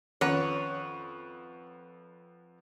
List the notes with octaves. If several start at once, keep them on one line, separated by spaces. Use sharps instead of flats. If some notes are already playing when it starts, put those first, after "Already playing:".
F2 D#3 C#4 B4 C#5 F#5